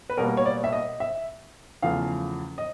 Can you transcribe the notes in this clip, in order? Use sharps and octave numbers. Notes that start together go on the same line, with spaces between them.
B4
B2 G3 A#3 A#4
C#5
D5
E5
D#5
E5
E2 C#3 F3 A3 F5
D#5